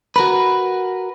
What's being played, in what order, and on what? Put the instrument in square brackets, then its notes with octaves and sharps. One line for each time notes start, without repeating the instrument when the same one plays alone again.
[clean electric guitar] F#4 A#4 B4